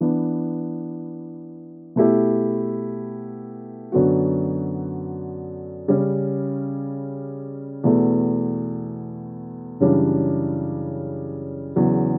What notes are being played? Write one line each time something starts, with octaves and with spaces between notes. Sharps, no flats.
E3 B3 D4
B2 A3 E4 G4
F#2 D3 F#3 B3 F#4
C#3 G3 C#4
E2 B2 A3
F#2 C#3 E3 G3 D4
E2 C#3 F#3